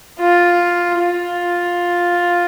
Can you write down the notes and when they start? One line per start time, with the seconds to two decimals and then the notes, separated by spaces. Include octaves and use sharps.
0.20 F4
1.00 F4